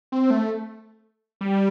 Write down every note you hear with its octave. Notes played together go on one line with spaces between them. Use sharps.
C4
A3
G3